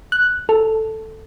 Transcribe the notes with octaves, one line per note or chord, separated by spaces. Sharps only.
F#6
A4